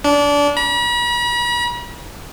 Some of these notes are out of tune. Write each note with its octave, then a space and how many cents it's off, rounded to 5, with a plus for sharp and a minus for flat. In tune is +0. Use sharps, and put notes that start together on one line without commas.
D4 -25
B5 -45